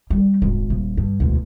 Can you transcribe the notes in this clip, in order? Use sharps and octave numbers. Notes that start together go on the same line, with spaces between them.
G3
D#1 G#1
D#1
G2
E1 D2